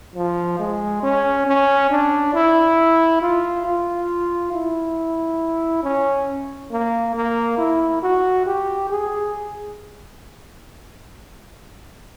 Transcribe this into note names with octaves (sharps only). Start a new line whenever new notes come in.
F3
G#3
C#4
C#4
D4
E4
F4
F4
E4
C#4
A#3
A#3
E4
F#4
G4
G#4